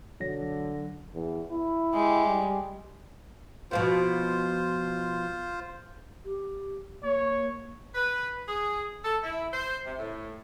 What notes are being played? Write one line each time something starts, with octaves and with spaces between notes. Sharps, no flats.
B1 D3 F#3 A#6
E2
E4
G#3 G4
G3
B2 F3 B3 F4 C5
G4
A#3 C#5
B4
G#4
A4
E4
C5
C3
A2